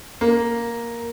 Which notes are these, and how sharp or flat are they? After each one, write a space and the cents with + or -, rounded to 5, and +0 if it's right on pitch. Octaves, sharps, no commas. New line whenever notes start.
A#3 +5